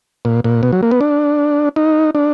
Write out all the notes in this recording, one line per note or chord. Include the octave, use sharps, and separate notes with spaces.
A#2
A#2
B2
F#3
A#3
B3
D4
D#4
D4